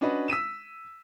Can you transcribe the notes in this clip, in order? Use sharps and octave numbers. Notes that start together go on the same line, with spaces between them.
C#4 D4 F#4 B4 D#5
E6 B6 D#7 E7